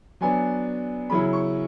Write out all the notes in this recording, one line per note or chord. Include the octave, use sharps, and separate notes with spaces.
F#3 B3 D4 G#5
C#3 F#3 C#4 E4 B5
C#6